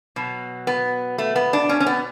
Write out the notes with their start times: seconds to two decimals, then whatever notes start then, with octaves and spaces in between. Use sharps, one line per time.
0.16 B2 F#3
0.67 B3
1.18 A3
1.36 B3
1.53 D4
1.69 C#4
1.80 C#4
1.87 B3